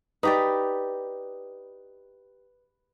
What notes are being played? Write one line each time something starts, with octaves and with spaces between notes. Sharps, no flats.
D#4 G4 B4 D5